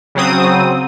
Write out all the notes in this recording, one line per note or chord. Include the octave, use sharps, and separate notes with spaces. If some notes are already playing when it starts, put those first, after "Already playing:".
C#3 F#3 C4 D#6